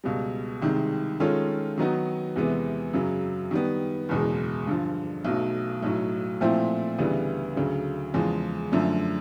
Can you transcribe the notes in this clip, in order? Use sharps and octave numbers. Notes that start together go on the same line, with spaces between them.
C#2 B2 G3
C2 C3 D#3 G#3
D#3 G#3 C#4 F4 A4
D#3 F#3 B3 D#4 F#4
E2 C3 E3 G#3 B3
F#2 C#3 F#3
D#3 G3 B3
F#1 E2 B2 G#3
G2 D3 F3
B1 B2 F#3 A3
B1 A2 F#3
A#2 F3 A3 C4 E4
D2 C#3 E3 G3 B3
D2 C#3 F#3
E2 C#3 F3 G#3
F#2 D3 F3 A3